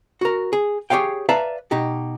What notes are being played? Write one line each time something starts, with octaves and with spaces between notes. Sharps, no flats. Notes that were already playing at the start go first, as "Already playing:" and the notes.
F#4 A#4
G#4
G4 G#4 C#5 F5 G5
B4 D5 E5 F5 A5 A#5
B2 D#4 G4